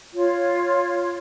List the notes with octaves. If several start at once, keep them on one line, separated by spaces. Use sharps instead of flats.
F4 C#5